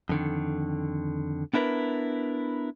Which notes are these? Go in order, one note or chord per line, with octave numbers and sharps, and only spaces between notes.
F2 D3 D#3
B3 D4 E4 A#4 B4